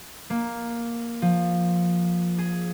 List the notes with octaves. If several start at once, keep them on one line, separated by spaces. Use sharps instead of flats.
A#3
F3
G#4